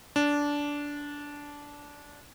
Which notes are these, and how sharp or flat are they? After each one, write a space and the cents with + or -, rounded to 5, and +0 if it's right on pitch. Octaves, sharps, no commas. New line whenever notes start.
D4 -15